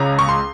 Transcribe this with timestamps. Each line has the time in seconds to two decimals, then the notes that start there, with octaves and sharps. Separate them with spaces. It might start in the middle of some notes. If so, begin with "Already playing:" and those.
Already playing: C#2 C#4 A#5
0.19 C#6
0.29 C6